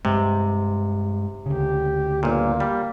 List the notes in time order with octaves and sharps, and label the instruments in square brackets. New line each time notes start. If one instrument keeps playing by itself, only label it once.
[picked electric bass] G2 G#3 [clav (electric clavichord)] C3
[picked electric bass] D2 C#3 [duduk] G4
[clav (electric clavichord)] G1 A#2 [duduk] A#3
[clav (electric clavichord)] G3